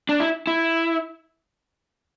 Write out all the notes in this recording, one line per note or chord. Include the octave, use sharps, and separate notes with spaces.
D4
E4
E4